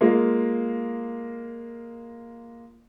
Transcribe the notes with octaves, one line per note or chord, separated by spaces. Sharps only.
G#3 A#3 F4